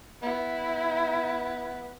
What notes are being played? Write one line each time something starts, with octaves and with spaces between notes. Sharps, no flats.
B3 E4